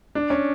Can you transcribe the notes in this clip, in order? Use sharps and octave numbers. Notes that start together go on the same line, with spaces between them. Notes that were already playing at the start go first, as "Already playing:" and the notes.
D4
C#4